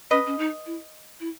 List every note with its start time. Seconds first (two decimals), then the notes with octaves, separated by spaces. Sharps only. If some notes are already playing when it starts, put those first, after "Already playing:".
0.11 C#4 B4 D#5
0.27 C#4
0.39 D#4
0.66 E4
1.20 E4